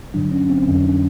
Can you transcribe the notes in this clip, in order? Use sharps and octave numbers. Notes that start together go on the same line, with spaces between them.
G2 D3 F#3 D4
C#4
C4
F2 D3 F#3 C#4
D4